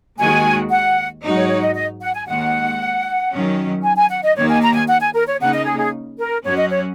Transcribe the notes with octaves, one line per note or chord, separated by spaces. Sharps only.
D#2 D#3 G#3 F#4 G#5
F#5
G#2 F#3 D#4 F#4
C#5
C#5
D#5
D#5
F#5
G#5
D#2 D#3 G#3 F#5
F#2 D#3 F#3 C#4
G#5
G#5
F#5
D#5
D#2 D#3 A#3 C#5
G#5
A#5
G#5
F#5
G#5
A#4
C#5
C#3 A#3 D#4 F#5
D#5
G#4
G#4
A#4
F#2 F#3 C#4 F#4 C#5
D#5
C#5